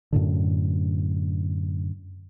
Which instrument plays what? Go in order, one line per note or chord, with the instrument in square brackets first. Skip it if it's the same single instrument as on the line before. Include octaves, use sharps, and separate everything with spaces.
[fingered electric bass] F#2 A2 D3